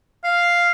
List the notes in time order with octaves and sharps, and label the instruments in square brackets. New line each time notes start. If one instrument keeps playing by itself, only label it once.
[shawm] F5